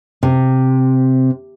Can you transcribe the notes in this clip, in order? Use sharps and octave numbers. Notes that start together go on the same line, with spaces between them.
C3